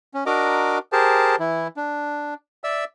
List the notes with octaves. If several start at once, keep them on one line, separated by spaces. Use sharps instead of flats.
C#4
D4 F#4 A#4 D#5 A#5 D6
G4 G#4 A#4 C5 A5
E3 E4
D4
D5 E5 E6